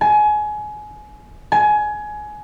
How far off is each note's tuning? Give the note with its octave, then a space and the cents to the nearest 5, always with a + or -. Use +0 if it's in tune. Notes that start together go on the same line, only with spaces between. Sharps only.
G#5 +25
G#5 +20